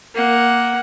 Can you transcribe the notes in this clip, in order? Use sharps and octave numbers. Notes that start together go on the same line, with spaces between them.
A#3 F#5